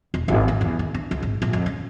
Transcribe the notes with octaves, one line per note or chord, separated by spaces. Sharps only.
E1
G#1
D#2
E2
D#3
D4
C#2
G#1
A#1
F2
C#4